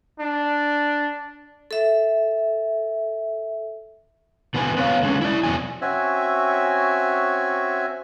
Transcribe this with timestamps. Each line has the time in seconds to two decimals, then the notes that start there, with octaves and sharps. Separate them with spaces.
0.20 D4
1.71 A4 E5
4.54 B2 D3 C4 B4 G#5
4.77 B3 B4 C#5 F5
5.03 D3 G#3 C#4
5.21 E4 D5
5.43 F2 B2 F3 F#3 G#5
5.81 C4 C#4 F#4 E5 G#5